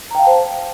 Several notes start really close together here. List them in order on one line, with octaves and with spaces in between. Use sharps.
A#5 G5 F5 A5 C5